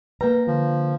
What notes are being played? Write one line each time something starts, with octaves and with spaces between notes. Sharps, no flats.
A#3 B4 G5 A#5
D3 F3